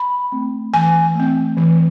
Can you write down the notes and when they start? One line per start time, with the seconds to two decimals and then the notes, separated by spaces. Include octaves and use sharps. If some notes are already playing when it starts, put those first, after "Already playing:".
Already playing: B5
0.32 A3 C4
0.74 E3 G#5
1.15 A3 C4
1.57 E3